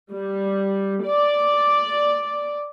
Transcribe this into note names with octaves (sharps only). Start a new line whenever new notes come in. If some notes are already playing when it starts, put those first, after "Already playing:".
G3
D5